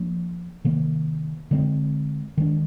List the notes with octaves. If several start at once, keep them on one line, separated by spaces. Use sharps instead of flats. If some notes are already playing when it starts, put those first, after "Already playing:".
Already playing: F3 A#3 D4
C3 D#3 A#3
D3 G#3 C4
D#3 G#3 D4